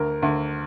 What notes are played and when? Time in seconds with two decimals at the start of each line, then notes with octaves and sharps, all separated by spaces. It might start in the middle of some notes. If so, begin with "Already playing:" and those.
Already playing: D2 A#4
0.22 D2